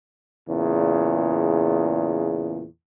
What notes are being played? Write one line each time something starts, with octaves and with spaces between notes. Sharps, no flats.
E2 A#2 C#3